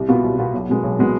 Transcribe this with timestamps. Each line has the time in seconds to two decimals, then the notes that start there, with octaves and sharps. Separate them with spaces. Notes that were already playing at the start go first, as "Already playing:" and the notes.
Already playing: C2
0.09 B2 B3 F4
0.23 C2
0.38 B2 B3 F4
0.53 B1
0.69 B2 G#3 B3
0.83 B1
0.99 B2 G#3 B3